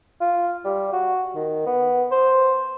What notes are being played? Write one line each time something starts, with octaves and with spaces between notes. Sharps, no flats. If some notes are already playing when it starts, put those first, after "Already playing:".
F4
G3
F#4
D#3
B3
C5